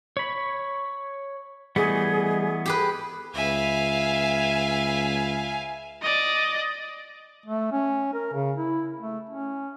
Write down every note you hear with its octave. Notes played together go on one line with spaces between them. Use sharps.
C#5 B5
E3 G3 A3 B3 G#4 D#5
G4 G#4 B4
C#2 B4 E5 F5 G#5
D5 D#5
A3
C#4
A#4
C#3
E4
A3
C#4